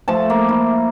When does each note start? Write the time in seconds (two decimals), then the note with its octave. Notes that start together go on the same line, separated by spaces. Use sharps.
0.08 F3 A3 A4 A5
0.30 A#3
0.49 E4